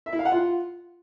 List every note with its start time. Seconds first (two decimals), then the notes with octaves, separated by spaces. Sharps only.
0.06 E5
0.13 E4
0.19 F5
0.25 F#5
0.32 F4